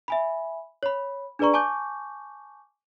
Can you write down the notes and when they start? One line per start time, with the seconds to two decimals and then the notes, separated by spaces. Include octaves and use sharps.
0.08 E5 G#5 B5
0.83 C#5 B5
1.39 D4 G#4 B4 D5 A#5 C#6
1.54 G#5 A5 C#6 D6 G6